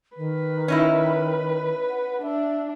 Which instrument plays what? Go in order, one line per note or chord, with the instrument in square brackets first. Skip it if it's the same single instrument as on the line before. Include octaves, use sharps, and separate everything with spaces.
[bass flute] D#3 [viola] B4
[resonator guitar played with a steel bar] C#4 D#4 E4
[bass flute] F#5
[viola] D4 [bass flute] E5